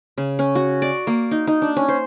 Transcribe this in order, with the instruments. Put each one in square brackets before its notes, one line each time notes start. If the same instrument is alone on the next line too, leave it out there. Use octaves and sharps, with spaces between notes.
[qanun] C#3
C#4
F#4
D5
A#3
D#4
D#4
D4
C#4
C5